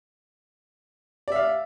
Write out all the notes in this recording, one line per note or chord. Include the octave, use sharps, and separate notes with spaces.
D5 E5 F5